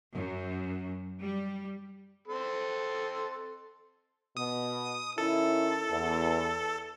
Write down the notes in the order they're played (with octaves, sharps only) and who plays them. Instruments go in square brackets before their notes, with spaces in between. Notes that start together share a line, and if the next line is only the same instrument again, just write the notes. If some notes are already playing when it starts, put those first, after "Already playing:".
[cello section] F#2
G3
[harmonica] C4 A4 C6
[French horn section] B2 [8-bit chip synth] D#6
[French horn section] D#3 C#4 E4 [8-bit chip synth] A4
[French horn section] E2